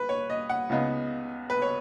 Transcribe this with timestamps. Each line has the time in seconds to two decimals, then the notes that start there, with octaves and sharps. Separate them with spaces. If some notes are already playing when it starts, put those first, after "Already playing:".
Already playing: B4
0.09 C#5
0.30 D#5
0.49 F#5
0.69 C#2 C#3 G#3 B3 D#4
1.50 B4
1.62 C#5